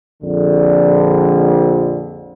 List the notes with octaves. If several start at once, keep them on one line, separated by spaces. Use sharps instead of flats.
A#1 F2 D3